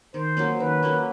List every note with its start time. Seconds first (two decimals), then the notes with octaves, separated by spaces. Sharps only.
0.14 D#3 C5
0.37 F#3 A#3 C#4
0.60 D#3 B4
0.83 F#3 A#3 C#4